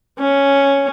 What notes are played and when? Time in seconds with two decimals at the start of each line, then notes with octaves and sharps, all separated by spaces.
0.19 C#4